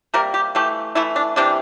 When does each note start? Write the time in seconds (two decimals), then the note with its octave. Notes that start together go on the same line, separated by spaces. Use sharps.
0.14 C3 G3 A#3 A#4
0.34 G4
0.55 E3 A3 G4
0.95 E3 A3 E4
1.16 D4
1.36 C3 E3 G3 D4